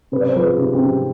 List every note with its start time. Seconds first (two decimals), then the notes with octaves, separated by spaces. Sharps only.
0.12 C3 B4
0.21 D5
0.28 C5
0.36 F3 B4
0.44 G#4
0.59 C3
0.75 C4
0.83 C3